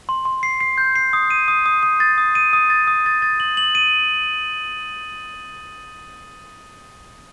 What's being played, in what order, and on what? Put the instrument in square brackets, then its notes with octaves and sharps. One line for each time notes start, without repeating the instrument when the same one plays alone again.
[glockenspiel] C6
C6
C7
C7
G6
C7
D#6
D#7
D#6
D#6
D#6
A6
D#6
D#7
D#6
A6
D#6
A6
A6
F#7
F#7
D#7